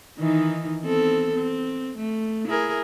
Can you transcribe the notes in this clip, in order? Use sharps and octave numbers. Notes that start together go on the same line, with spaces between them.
D#3 E3 D#4
B3 C4 A4
C4
A3
E4 G#4 A#4